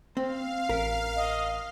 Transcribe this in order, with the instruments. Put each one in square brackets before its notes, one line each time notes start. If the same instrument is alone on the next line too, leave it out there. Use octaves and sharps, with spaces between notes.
[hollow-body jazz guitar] C4 [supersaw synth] F5
[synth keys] A1 B6 [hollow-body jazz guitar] A#4
[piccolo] D#5